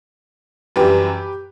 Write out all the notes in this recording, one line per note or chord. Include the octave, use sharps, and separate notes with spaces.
F#2 E3 G3 G4 B4